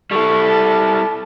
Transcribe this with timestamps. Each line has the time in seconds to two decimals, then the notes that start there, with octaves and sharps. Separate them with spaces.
0.11 G3 E4 A4 C#6
0.47 A5